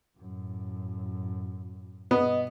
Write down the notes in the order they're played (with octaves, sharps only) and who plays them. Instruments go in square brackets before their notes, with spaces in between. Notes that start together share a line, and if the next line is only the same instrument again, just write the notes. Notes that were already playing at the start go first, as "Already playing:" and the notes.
[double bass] F#2 A2
[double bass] G2 B2 [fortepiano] B3 [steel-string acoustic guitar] D#5